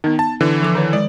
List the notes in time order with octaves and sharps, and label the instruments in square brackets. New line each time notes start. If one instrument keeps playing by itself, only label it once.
[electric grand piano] D#3 [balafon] B3 D#4
[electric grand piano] A5
D3 E3
[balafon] F3 A4 D6
D#3 B4 C#5
[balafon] G#3 [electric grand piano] D5